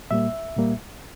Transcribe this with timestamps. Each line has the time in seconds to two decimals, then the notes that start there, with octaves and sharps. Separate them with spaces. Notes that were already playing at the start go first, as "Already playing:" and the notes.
0.11 A#2 G3 A#3 E5
0.56 A#2 G3 A#3